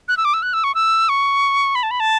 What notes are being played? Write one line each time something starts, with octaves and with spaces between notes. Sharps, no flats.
F#6
E6
D6
E6
F#6
E6
C#6
E6
C#6
B5
A5
B5
A5